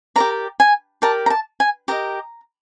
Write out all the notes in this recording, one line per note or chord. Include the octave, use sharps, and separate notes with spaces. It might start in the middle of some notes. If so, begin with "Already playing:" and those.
G4 A#4 D5 A#5
G#5
G4 A#4 D5 A5
A#5
A5
G#5
G4 A#4 D#5 A#5